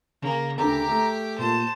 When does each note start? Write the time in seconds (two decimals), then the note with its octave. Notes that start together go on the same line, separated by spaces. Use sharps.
0.22 C#3 A#3
0.58 D2 C#3 G4 A4 A#5 D6
0.89 A3
1.38 A#2 C5 A5